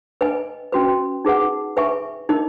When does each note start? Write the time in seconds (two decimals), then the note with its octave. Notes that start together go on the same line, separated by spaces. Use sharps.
0.21 B4 D#5 G#5
0.72 C#4 F#4 B4
1.25 D#4 G#4 B4 F#5
1.77 B4 E5 G#5 C#6
2.29 D#4 A#4 D#5